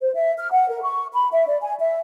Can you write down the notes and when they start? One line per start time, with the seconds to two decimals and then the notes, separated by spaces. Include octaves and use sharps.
0.01 C5
0.15 E5
0.38 F6
0.52 F#5
0.69 A#4
0.83 C#6
1.13 B5
1.33 E5
1.47 D5
1.62 G#5
1.80 E5